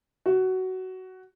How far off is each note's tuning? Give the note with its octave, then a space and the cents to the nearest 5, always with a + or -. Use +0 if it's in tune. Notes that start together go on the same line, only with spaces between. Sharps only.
F#4 +15